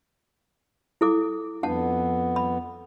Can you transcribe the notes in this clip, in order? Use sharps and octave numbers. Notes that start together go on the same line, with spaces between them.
E4 A4 D6
F2 B3 D4 F#5 A5
B5